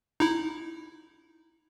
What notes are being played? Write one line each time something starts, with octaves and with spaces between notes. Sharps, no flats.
D#4 E4